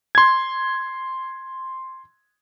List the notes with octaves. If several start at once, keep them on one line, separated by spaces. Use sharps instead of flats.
C6 G#6